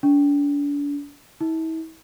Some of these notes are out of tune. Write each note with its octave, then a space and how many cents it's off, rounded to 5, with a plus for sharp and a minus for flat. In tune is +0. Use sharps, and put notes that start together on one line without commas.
D4 -40
E4 -40